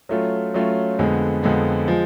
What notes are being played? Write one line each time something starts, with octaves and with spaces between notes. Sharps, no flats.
F#3 A3 C#4 F4
F#3 A3 C#4 F4
F2 D3 G#3 B3
F2 D3 G#3 B3
F3 G#3